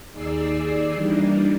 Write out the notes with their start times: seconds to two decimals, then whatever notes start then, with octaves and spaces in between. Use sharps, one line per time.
0.11 D#2 D#4 G#4 D5 E6 C7
0.94 E3 G3 A#3 D4 D#4